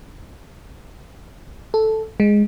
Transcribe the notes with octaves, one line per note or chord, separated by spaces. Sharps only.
A4
G#3